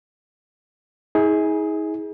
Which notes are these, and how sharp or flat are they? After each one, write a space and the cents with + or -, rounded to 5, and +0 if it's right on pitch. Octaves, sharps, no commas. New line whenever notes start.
D#4 +45 G#4 +0